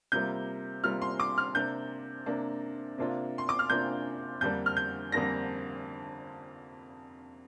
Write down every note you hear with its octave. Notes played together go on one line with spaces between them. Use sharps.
C3 G3 A#3 F4 G6
C3 G3 A#3 F4 F6
C6
D6
F6
C3 A#3 D4 G6
C3 A#3 D4
C3 A#3 D4 F4
C6
D6
F6
C3 A#3 D4 F4 G6
F2 D3 G3 A#3 D4 G6
F6
G6
F2 D3 G3 A#3 D4 A#6